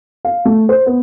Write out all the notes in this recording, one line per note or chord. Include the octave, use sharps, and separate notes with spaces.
F5
A3
C5
B3